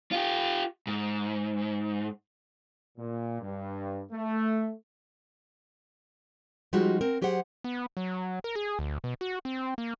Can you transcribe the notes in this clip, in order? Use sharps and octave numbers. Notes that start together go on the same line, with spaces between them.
F4 G4
G#2
A#2
G2
A3
F3 G3 G#3 D#4 F4 F#4
C4 A#4
F#3 G4 G#4 C5 F#5
B3
F#3
A#4
G#4
D2
B2
F#4
C4
A#3